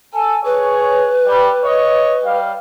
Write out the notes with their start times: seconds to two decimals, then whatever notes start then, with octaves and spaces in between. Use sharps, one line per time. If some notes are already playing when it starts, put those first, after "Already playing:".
0.13 A4 G#5
0.45 G#4 B4 C#5
1.26 G3
1.64 C#5 D#5
2.23 G3 F5